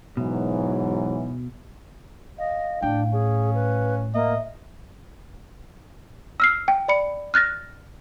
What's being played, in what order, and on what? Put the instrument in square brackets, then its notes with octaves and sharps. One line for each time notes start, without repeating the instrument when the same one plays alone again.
[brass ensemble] G#2 E3 F#3 [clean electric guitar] B2
[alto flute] D#5 [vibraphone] F5
[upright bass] A2 [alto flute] D4 [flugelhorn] G5
[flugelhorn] C#4 [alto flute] G#4
[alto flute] B4
[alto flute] A#3 [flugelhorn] D#5 [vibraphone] E5
[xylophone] E6 F6 C7
G5
D5 B5 C#7
F6 F#6 A6 A#6